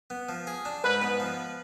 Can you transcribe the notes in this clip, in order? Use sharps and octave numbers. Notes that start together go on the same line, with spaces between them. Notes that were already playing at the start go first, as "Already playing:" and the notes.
B3
F3
G#4
D4
G#2 B4
B3
F3